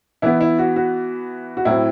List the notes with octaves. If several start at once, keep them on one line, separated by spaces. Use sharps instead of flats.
E3 B3 E4
E4
F#4
F#4
F#4
A2 F#3 C4 E4